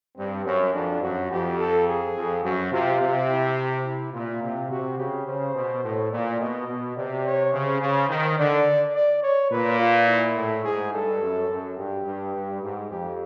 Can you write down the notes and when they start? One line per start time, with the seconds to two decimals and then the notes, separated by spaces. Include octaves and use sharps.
0.17 G2 C4
0.45 F#2 C#4
0.73 F2 D4
1.02 F#2 F#4
1.31 F2 G4
1.58 A4
1.88 G#4
2.16 F2
2.43 F#2 F#4
2.72 C3 F4
3.00 C3
3.28 E4
3.85 E4
4.13 A#2 F4
4.42 C3
4.70 C3 F#4
4.98 C#3 G4
5.26 C#3 C5
5.55 B2
5.83 A2
6.12 A#2 D5
6.39 B2 D#5
6.67 B2
6.96 C3 D5
7.25 C#5
7.52 C#3 C5
7.81 C#3
8.09 D#3
8.37 D3 D5
8.94 D5
9.22 C#5
9.51 A#2 B4
9.79 F4
10.07 E4
10.36 A2
10.64 G#2 G#4
10.92 G2 A4
11.21 F#2
11.50 F#2
11.77 G2 G4
12.06 G2
12.35 G2
12.62 G#2
12.91 F2 G4